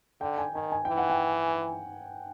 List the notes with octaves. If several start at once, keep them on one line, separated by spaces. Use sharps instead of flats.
D3 G5
G#5
D#3 G#5
G#5
E3 G5
F#5
G5